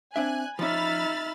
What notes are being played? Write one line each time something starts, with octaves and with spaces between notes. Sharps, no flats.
C4 D4 E5 G#5 F#6
F3 C#4 D#4 E5 B5 F6 A6